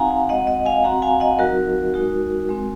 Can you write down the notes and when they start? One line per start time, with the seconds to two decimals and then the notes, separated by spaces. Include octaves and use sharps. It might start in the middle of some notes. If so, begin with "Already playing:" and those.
Already playing: C4 D#4 F#4 F5 F#5 G#5 A#5
0.11 F5 G#5
0.29 G#3 C4 F#4 D#5 F#5
0.47 D#5 F#5
0.66 F5 G#5
0.84 F#3 C4 F#4 F#5 A#5
1.02 F5 G#5
1.20 D#5 F#5
1.39 F#3 C4 D#4 F#4 A#4
1.94 G#3 D#4 F#4
2.49 G#3 C4 F#4